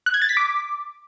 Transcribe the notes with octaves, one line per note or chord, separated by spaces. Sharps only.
F#6
G#6
A6
B6
D6